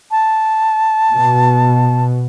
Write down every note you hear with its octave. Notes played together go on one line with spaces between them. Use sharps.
A5
B2